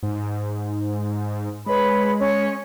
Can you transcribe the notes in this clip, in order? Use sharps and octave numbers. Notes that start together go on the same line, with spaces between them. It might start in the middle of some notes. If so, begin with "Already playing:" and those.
G#2
G#3 B4 C#5 B5
C#4 C#5